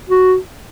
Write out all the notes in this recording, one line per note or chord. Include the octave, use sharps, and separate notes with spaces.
F#4